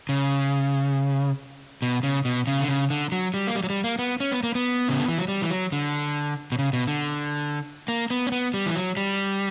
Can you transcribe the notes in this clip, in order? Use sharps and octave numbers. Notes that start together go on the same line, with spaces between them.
C#3
B2
C#3
B2
C#3
D3
C#3
D3
F#3
G3
A#3
G3
F#3
G3
A#3
B3
C#4
B3
A#3
B3
C#3
D3
E3
F#3
G3
E3
F#3
D3
B2
C#3
B2
D3
A#3
B3
C#4
B3
G3
E3
F#3
G3